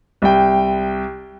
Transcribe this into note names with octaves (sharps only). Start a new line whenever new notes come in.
C2 G5